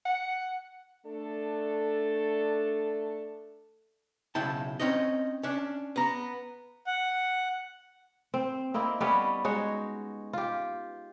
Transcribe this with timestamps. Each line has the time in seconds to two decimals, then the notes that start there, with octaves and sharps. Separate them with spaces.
0.05 F#5
1.06 A3 D4 A4
4.35 B1 C#3 E4 G5 A5
4.80 C4 C#4 D#4 C#5 D#5
5.43 C#4 D4
5.96 B3 A#5
6.87 F#5
8.34 C4
8.74 A#3 C4 D#4 E4
9.00 G3 B3 C#4 D#4
9.45 G#3 D#4 F#4 C#5
10.33 F4 G4